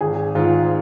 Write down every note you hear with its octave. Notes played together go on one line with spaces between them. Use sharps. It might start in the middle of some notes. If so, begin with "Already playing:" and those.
G#1 G#4
G#2 D#3 F4